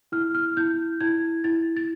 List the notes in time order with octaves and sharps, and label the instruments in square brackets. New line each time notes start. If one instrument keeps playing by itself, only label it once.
[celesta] E4 F6
F6
E4 G6
E4 G#6
E4 A6
A6